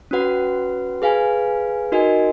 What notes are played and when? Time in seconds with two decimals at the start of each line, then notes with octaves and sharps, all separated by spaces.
0.11 C#4 F#4 B4 F#5
1.02 G#4 B4 F5 G#5
1.92 D#4 F#4 A#4 D#5 G#5